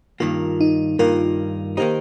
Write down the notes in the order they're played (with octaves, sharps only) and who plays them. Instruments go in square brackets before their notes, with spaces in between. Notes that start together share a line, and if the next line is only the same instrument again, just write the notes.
[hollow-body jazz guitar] G2 D#3 A#3 [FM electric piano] F4
[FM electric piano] D#4
[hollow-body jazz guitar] G2 D#3 A#3 [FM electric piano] F4 A#4
[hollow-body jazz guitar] D#3 A#3 D#4 [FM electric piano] G4 C5